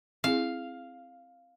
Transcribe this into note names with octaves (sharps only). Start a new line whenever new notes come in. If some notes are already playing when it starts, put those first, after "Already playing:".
C4 E4 G#4 F5